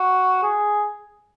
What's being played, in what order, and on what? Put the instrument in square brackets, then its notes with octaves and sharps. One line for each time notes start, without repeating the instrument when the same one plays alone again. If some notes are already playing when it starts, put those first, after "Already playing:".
Already playing: [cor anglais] F#4
G#4